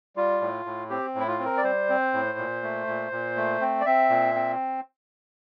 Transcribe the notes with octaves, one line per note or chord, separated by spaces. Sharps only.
G3 F4
A2
A2
C4 G4
A2 E4
F4
C4
A#4
D5
G3 C5
C4
A2
A#2
A3
A#2
A#2
A3
C4
D5
C4 E5
A#2
C4